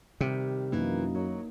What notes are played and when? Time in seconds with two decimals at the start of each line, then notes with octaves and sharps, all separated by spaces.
0.21 C3 D#3 G3 G4
0.72 F#2 E3 A#3 D#4
1.15 F#3